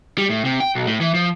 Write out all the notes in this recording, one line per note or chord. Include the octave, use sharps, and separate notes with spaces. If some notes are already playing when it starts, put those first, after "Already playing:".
G3
A2
C3
G5
B1
A2
E3
F3